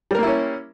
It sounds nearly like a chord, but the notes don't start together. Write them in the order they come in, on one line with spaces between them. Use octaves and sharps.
G3 A#4 A#3 E4 C#4